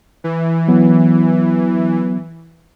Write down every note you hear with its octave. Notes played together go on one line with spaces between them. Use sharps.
E3
F#3 B3